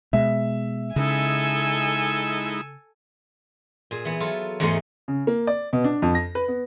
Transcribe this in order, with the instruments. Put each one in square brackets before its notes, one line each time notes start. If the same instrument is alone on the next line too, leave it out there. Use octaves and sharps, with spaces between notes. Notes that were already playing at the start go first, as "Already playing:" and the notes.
[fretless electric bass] B2 G#3 [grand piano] E5
[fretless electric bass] C#3 [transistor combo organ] G#3 D#4 E4 [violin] A4 G#5
[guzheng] A#2 G#4
E3 B3
F#3 F4 A4
E2 G#2 A3 D#4 F#5 C6
[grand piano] C#3
A#3
D5
B2
D4
F2
A#6
B4
B3